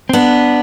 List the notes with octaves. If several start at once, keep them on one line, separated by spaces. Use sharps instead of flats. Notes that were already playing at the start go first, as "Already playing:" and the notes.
C4
B3 D4